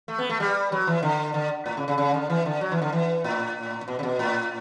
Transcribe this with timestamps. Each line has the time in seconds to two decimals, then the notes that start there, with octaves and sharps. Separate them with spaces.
0.08 A3
0.18 B3
0.29 A3
0.40 G3
0.72 F#3
0.87 E3
1.03 D3
1.34 D3
1.66 A2
1.77 C#3
1.88 C#3
1.98 C#3
2.14 D3
2.30 E3
2.46 D3
2.61 F#3
2.72 E3
2.82 D3
2.92 E3
3.24 A2
3.88 B2
3.99 C#3
4.03 B2
4.19 A2